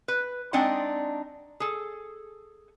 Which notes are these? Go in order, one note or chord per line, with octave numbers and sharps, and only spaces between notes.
B4
G#3 C4 D4 D#4 D5 F#5
G#4 A4